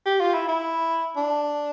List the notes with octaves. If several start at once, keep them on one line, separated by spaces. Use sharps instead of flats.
G4
F4
E4
E4
D4